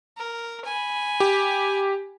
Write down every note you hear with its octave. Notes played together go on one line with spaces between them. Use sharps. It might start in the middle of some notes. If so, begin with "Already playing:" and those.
A#4
G#5 B5
G4